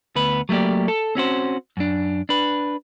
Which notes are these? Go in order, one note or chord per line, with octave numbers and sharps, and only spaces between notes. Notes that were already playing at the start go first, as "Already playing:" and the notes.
D2 B3 B4
F#3 A3 A#3 G4 D5
A4
C4 C#4 F#4 C5
F#2 D4
D4 B4